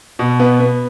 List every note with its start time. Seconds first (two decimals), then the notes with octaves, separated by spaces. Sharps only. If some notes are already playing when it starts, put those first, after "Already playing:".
0.19 B2
0.40 B3
0.60 B3